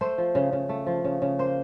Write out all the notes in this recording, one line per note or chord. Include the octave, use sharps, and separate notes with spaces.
A3 C5
F3
C#3
C#3
A3
F3
C#3
C#3
A#3 C5